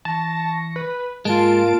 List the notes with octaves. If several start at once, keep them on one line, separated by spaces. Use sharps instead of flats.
E3 A5 C#6 A#6
B4
G#2 G#3 A#3 F4 A#4 A5 D7